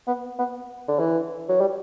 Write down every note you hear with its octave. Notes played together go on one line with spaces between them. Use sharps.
B3
B3
D3
E3
F#3
G3